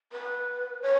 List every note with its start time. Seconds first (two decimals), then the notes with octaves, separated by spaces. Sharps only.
0.12 B4
0.82 C#5